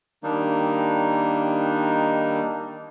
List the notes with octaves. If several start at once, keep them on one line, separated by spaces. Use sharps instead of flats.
D#3 G3 A#3 D4 D#4